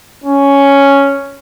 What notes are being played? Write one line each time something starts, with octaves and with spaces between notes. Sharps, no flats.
C#4